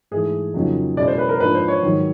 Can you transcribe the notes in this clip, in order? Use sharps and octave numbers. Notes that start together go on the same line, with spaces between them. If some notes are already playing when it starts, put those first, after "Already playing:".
G#2 E3 A3 G#4
F2 C#3 F#3 A#3 D#4
B2 G#3 C#4 E4 D5
C5
B4
A#4
G#2 F3 A#3 D4 B4
C5
C#5
G#2 D#3 F#3